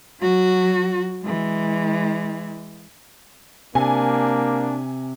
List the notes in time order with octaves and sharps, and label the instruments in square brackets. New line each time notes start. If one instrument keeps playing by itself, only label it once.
[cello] F#3 F#4
E3 G#3
[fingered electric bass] C3 [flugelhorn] A#3 [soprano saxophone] D4 [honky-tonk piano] G#5